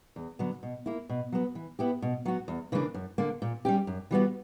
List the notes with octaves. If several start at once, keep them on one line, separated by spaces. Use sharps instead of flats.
E2
D3 F#3 B3
B2
A#3 E4
B2
F#3 B3
E3
B3 E4 G4
B2
F#3 B3 F#4
E2
C#3 E3 A#3 D4
F#2
D3 A#3
A#2
G3 C#4 G4
F#2
E3 G3 B3 F#4